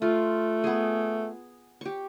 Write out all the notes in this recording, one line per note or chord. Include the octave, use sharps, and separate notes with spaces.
A3 F4
B3 G#4
G4 C#6